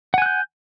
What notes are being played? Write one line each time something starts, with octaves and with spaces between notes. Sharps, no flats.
F#5 G#5 F#6 G6